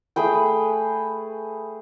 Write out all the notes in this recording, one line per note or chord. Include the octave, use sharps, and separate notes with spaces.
A3 G#4 B4 G5